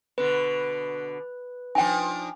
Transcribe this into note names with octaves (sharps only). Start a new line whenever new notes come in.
B2 D3 B4
F3 D4 D#4 G5 G#5